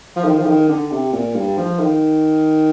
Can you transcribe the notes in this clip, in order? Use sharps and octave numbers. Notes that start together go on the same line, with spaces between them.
F3
D#3
F3
D#3
D3
C3
A#2
G2
F3
D#3